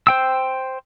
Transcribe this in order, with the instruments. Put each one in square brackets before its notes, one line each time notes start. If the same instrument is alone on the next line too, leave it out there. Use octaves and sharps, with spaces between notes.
[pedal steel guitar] C5 G5 E6